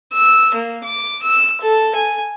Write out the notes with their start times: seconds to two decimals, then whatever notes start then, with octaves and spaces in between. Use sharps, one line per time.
0.13 E6
0.55 A#3
0.84 D6
1.23 E6
1.61 A4
1.95 G#5